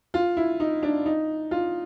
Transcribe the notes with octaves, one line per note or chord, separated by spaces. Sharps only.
F4
E4
D#4
D4
D#4
F4